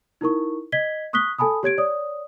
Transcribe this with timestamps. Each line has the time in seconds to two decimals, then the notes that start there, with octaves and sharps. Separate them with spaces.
0.21 D#4 E4 A#4 C#6
0.72 D#5 G#6 B6 G7
1.13 C#6 D#6 F#6 B6 G7
1.38 A4 G#5 A5 B5 D#6
1.63 G4 C#5 G#6 D7
1.78 C#5 D5 D#6